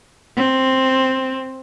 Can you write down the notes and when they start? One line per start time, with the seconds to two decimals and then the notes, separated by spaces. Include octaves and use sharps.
0.36 C4